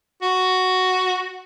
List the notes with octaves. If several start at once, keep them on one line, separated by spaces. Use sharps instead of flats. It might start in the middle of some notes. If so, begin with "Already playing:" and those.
F#4